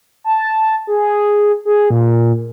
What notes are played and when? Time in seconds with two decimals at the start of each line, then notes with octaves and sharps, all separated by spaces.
0.24 A5
0.87 G#4
1.65 G#4
1.90 A#2